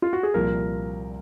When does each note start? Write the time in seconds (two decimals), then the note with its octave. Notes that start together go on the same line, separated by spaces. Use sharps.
0.02 F4
0.13 F#4
0.23 G#4
0.34 C2 A#2 F3 A#4